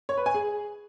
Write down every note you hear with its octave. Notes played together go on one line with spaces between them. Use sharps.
C#5
B4
G#5
G#4